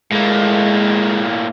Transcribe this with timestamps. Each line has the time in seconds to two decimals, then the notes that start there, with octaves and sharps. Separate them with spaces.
0.12 A2 G#3 A#3